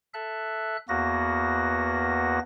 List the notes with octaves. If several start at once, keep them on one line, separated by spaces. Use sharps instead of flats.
A4 E5 F#6
E2 A#3 B3 F#4 A#6